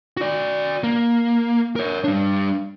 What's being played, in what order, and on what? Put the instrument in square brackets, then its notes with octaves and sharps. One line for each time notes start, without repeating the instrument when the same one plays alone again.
[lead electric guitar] F#4 D5
A#3
A#4 C#5
G3 D4